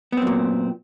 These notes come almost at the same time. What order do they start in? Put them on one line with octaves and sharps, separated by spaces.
B3 C4 F#2 A#2